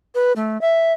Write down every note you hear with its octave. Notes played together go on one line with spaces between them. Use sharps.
B4
A3
E5